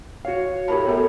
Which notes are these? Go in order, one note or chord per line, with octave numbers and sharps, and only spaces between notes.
F#4 C#5 F5
A2 G4 A#4 A5 B5
F#2 B3 A4